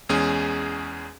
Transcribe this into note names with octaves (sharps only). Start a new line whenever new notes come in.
E2 G#3 C#4 G#4 G#5